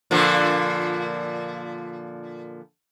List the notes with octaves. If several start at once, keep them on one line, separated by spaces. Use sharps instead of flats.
A#2 D3 F3